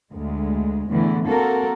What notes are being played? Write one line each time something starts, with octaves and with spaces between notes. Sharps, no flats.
D2 G#3
E2 A2 D3 E3 A3
A#3 C4 F#4 A4 A#4